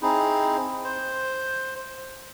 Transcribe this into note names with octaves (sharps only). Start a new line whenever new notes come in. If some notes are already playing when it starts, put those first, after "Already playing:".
C4 D#4 E4 G#4
C5